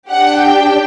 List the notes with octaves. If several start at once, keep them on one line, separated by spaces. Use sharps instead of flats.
D4 G4 F#5
G5